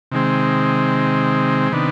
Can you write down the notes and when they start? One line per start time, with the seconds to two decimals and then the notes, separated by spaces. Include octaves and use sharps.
0.12 C3 D#3 G#3 C4
1.72 C3 D#3 B3 D4